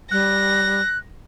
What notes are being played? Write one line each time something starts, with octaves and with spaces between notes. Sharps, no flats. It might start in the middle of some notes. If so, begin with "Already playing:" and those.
G3 F#6 A#6